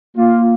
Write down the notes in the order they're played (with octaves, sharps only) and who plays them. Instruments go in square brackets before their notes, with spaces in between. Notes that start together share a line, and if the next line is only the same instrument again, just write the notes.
[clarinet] A#3 [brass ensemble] F4